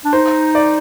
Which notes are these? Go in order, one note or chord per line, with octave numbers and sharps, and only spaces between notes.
D4
D#4 C5
D5